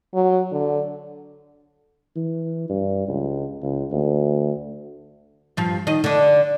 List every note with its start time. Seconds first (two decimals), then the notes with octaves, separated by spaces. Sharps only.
0.15 F#3
0.52 D3
2.16 E3
2.69 G2
3.08 C#2
3.63 C#2
3.92 D2
5.57 G2 F3
5.87 D#3 D#5
6.04 D3 D4